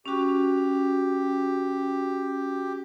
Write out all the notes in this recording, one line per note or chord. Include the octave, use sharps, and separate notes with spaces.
C#4 F#4 G4